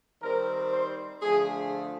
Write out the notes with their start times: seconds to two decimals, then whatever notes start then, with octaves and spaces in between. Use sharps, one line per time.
0.21 D#3 G3 C4 A#4
0.72 C5
1.21 D3 F3 A3 G#4